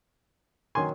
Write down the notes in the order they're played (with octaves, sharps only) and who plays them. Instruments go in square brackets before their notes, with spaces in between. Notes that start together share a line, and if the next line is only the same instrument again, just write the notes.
[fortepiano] D#3 F#3 G#5 C6